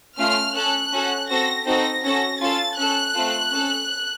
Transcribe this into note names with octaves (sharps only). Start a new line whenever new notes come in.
A3 C#4 F4 F6
C#4 A4 F#6
C#4 F#4 A4
C4 F#4 A4 A#6
C4 D#4 F#4 A4 A#6
C#4 F#4 A4 A#6
C#4 F4 A4 A6
C#4 A4 F#6
A3 C4 F4 A4
C#4 A4